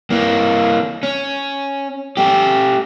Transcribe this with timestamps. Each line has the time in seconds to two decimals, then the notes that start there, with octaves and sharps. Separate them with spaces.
0.10 E3 A#3
1.03 C#4
2.17 A3 G4